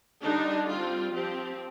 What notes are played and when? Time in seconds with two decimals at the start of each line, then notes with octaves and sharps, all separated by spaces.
0.21 D3 G3 D4 D#4
0.67 G3 C4 F4
1.12 F3 C4 G4